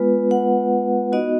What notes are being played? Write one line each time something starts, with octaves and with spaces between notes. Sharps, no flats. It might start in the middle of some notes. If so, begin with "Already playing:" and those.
Already playing: G#3 B3 F4 B4
F#5
B3 D#4 F#4 D#5